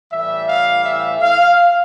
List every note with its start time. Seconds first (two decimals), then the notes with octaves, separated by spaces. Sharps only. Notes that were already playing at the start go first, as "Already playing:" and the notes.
0.10 A2 E3 G3 E5
0.46 F5
0.83 E5
1.20 F5